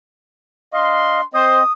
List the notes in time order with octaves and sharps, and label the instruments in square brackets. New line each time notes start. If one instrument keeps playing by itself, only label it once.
[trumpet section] D4 C6 [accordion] D#5 F5
[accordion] C4 D#5 [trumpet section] C5 [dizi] D#6